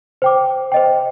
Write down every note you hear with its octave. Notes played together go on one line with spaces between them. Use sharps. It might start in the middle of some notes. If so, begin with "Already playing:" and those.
C5 G5 D6
C5 D#5 G5